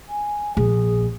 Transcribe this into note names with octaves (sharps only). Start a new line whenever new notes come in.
G#5
A#1 G#4